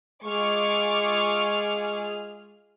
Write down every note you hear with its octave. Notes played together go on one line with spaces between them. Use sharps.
G#3 F4 G#4 C#6 D6 F6